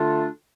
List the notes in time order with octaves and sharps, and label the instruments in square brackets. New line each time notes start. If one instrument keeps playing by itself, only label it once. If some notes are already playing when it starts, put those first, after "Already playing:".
Already playing: [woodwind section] D3 A3 D4 F4 A4